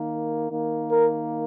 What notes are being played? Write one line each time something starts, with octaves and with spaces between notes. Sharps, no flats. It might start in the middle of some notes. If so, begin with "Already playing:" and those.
Already playing: D#3 A#3
D#3 A#3
A#4